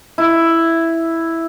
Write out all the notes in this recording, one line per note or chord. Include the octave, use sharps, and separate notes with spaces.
E4